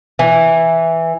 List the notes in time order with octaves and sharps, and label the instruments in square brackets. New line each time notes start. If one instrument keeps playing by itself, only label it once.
[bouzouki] E3